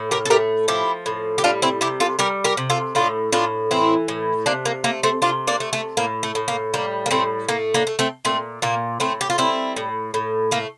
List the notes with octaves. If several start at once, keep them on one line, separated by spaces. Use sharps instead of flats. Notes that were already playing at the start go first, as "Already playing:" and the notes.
Already playing: A2
G4 A#4
A4
A3 G4 A#4
F3 E4 G4
A2
G4
G3 D4 F4
C4 E4
C3 E4 G4
F4 A4
G3 G4 A#4
G4 A#4
C3
F4 A4
A2 D4 F4
A2 D4 F4
E3 C4 E4
A2
C3 A#3 D4
A#3
A3 A#3
A3 C4
C3 D4 F4
A#3 D4
A3
A3
A2 A#3
A3
A2
A#3
G3 A#3
A#3
A2 A3 C4
A3 A#3
A#3 D4
A3
A3 C4
A#2 A3 C4
A#2 A#3
A2 A3 C4
G4
F4
G3 C4 E4
A2
A2
A3 A#3